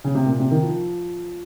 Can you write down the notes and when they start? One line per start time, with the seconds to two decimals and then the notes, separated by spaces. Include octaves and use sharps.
0.04 C#3
0.15 C3
0.26 A#2
0.39 C3
0.51 D#3
0.63 F3